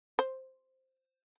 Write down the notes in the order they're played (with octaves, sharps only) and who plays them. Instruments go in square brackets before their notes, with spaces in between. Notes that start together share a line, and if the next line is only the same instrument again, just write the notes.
[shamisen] C5